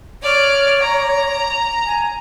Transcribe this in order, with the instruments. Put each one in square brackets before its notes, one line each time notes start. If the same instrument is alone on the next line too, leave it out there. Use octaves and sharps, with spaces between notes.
[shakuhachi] C#5 [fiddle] D5 F6
[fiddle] A#5
[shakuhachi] G#5